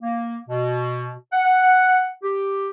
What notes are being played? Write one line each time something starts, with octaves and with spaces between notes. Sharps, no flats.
A#3
B2
F#5
G4